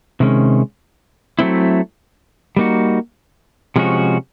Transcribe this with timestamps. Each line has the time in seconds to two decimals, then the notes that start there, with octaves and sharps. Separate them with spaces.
0.20 C3 D#3 G#3 C#4
1.39 F#3 A3 C4 E4
2.57 G3 A#3 D#4 F#4
3.76 C3 F3 G#3 C#4 F#4